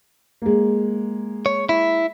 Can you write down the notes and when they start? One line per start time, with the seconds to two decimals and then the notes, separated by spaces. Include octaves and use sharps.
0.42 G#3 A#3
1.46 C#5
1.69 E4